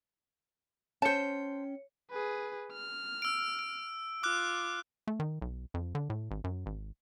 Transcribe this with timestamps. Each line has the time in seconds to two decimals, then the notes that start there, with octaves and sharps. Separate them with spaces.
1.02 C#4 C5 C#5 G5 A5 C#7
2.11 G#4 B4
2.72 F6
3.22 E6 D7
3.59 D7
4.23 F4 D6 F6 F#6
5.08 A3
5.20 D#3
5.42 B1
5.74 F2
5.95 D3
6.10 A2
6.31 G#1
6.44 F#2
6.66 G#1